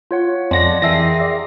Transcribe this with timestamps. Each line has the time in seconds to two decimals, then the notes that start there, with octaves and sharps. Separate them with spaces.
0.11 F4 C#5 F#5
0.51 F2 G#3 A4 D5 F#5 C6 A#6
0.82 E3 G4 G#4 A#4 E5 A#6 C7
1.19 D5 E5